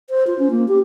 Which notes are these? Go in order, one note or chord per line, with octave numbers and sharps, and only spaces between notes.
C5
F4
C#4
A#3
G4